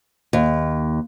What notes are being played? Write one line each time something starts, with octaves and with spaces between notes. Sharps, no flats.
D#2